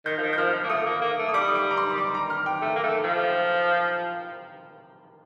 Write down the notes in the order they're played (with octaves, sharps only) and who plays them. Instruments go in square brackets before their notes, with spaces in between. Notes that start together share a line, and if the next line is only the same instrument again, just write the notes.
[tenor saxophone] D#3 [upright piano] G6
[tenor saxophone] F3
D#3
[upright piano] G6
[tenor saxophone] F3 [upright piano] F6
[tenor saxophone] F3
A#3
[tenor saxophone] A3 [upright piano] D#6
[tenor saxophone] A#3
A#3
A3
[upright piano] D#6
[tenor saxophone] G3 [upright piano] D6
[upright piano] D#6
D6
A#5
C6
D6
A#5
F6
G5
[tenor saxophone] A3
A#3
A3
F3